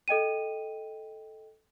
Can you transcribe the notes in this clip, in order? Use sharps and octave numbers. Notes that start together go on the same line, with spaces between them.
A4 D#5 G5 D#7